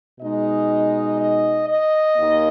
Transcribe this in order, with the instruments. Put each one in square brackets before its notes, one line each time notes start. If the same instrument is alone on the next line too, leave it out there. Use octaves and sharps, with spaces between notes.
[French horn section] B2 G#3 D#4 D#5
D#5
D#5
D#2 D#3 A#3